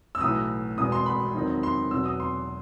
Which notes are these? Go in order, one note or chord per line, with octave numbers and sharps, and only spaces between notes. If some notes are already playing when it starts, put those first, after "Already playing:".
E6
B1 A2 E3 D#6
E1 E2 B2 D#6
C6
B5
E2 D#3 F#3 C4 D#4
C6
E2 B2 F#3 E6
D#6
C6